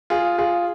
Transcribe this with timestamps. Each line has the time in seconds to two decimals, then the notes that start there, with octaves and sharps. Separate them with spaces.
0.10 F4 G#4
0.38 F4 G#4